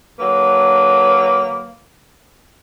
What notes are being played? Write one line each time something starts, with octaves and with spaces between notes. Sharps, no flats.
D3 F#3 A#3 B4